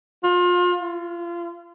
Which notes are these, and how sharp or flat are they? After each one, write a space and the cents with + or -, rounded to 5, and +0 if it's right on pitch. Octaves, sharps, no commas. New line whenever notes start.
F4 +30
F4 -30